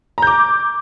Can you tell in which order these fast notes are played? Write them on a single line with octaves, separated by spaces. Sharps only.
A#5 G6 D6